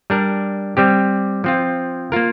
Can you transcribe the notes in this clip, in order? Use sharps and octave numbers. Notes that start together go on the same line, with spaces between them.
G3 D4 A#4
G3 C4 G4
F3 C4 F4
A#3 F4 A#4